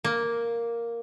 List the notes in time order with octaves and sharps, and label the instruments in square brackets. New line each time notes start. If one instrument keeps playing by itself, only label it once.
[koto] A#3